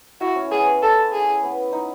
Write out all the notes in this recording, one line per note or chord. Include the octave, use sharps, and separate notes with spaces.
E4 F#4
C#4
B3 G#4
C#4
A4
G#4
B3
D#4